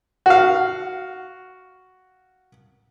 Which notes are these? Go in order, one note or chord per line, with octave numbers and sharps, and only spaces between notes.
F#4 F5